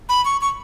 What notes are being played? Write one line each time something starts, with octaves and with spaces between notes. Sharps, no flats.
B5
C#6
C#6